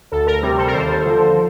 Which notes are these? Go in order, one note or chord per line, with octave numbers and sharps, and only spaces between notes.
D2 A4
A#4
C3 G3 A#4
A4 C5
A#4
D#2 A4 C5
D3 F3